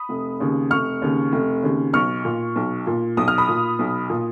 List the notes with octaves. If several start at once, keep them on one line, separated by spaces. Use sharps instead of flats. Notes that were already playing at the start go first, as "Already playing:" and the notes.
Already playing: B5 D#6
F1
D#2 C#3
F1 C#6 F6
D#2 C#3
F1
D#2 C#3
B1 C#6 F6
A#2
B1
A#2
B1 D#6
F6
B5 D#6
A#2
B1
A#2